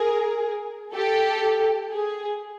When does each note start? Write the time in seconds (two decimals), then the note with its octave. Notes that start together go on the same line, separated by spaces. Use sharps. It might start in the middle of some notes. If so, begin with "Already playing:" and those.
Already playing: G#4 A#4
0.94 G4 A4
1.91 G#4